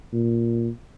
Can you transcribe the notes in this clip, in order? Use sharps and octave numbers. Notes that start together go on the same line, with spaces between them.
A#2